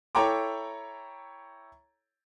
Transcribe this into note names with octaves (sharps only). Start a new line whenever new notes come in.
E4 A4 C#5 G5 A#5 D6